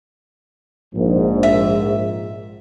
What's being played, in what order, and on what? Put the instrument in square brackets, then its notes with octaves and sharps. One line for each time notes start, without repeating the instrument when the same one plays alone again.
[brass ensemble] A#1 G#2
[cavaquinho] E5